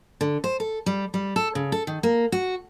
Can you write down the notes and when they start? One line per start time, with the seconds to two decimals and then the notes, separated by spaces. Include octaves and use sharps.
0.21 D3
0.44 C5
0.60 A4
0.86 G3
1.14 G3
1.36 A4
1.55 C#3
1.72 A4
1.87 D#3
2.03 A#3
2.32 F#4